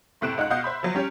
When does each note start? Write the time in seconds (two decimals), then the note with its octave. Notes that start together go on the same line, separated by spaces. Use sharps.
0.21 F#1 A2 C3 F#6 D7 E7
0.38 C#2 D#4 F#5 F#6
0.50 B2 D#5 F5 F#5 G6
0.64 C5 E5 B5
0.83 F3 F#3
0.95 G3 C#4 G4 C#5